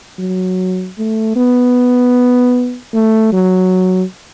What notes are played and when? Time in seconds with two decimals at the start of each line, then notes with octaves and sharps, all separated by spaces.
0.19 F#3
0.99 A3
1.37 B3
2.94 A3
3.33 F#3